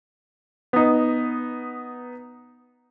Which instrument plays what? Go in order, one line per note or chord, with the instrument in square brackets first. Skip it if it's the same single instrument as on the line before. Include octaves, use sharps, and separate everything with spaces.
[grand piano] B3 D#4